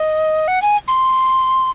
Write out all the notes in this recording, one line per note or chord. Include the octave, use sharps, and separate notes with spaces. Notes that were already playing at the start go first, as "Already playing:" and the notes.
Already playing: D#5
F#5
G#5
C6